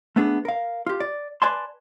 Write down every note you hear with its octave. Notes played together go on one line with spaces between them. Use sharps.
A3 B3 D4 G#4
A#4 F5
F4 G4
D5
B4 D5 G#5 A5 C6